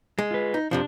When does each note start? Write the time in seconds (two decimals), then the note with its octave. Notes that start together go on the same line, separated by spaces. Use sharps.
0.19 G#3
0.31 F4 B4
0.54 D#4
0.71 F2 C3 F3 D4